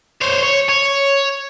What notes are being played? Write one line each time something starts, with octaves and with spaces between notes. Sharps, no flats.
C5 C#5
C#5
C#5